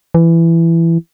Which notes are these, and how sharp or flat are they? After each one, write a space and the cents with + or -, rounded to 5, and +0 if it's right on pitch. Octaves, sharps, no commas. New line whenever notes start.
E3 +15